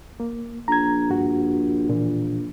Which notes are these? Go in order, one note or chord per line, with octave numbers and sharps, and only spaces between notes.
A#3
A#1 A#5 G#6
G2 F#4
A#2 E3